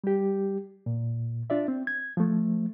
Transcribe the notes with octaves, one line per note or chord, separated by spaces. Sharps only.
G3 G4
A#2
D4 F4 D5 E5
C4
G#6
F3 A3